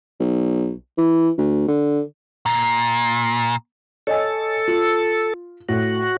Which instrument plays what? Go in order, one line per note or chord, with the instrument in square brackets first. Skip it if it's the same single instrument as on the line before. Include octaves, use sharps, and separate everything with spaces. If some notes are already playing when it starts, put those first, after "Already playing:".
[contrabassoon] B1
E3
D2
D3
[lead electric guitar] A#2
[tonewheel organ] A4 [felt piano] C#5 D#5 G#5
[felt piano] F4
[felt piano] A2 [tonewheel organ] F#4